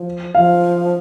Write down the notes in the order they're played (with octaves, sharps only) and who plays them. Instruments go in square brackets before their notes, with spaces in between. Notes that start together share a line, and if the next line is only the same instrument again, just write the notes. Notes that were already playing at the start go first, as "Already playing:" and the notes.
Already playing: [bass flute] F3
[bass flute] F3 [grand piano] F5